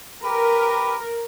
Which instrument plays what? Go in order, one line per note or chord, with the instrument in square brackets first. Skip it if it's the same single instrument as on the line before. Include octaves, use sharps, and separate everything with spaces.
[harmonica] G4 B4 [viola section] A#4